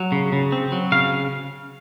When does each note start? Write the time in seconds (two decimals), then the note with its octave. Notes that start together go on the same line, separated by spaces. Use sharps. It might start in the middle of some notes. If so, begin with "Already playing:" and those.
Already playing: F#3
0.12 C#3
0.33 C#3
0.52 C4
0.72 F#3
0.92 C#3 F5